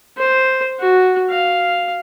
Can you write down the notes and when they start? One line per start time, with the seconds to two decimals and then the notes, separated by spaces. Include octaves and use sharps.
0.17 C5
0.79 F#4
1.30 F5